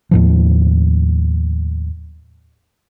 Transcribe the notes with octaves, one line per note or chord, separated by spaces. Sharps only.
D#2 A2 F3